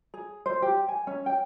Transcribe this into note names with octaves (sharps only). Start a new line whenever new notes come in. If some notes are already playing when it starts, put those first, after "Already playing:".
G#4
C5
G4
G#5
C#4
G5